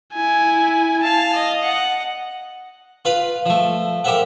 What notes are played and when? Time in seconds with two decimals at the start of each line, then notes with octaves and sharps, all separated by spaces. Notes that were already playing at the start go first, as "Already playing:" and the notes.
0.14 E4 G#5
1.03 F5 A5
1.34 D#5
1.63 F#5
3.05 F4 B4 F5 B5
3.46 F3 A3
4.04 G4 A#4 C5 E5 F#5